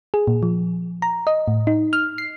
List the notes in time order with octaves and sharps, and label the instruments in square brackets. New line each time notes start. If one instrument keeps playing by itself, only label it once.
[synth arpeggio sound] G#4
A#2
F3
A#5
D#5
A2
D#4
F6
C7